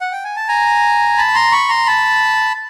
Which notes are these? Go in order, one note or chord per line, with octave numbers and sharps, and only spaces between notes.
F#5
G5
G#5
A5
G#5 A#5
A5 B5
A#5 C6
B5 C#6
A#5 C6
A5 B5